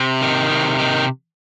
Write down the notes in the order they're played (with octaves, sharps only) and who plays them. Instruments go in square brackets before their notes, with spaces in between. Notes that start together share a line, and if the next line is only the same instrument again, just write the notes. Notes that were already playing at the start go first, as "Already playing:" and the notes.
Already playing: [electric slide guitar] C3
D#3
C3
D#3